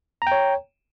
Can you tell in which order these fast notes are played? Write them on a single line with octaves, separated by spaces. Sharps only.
A#5 G5 C#5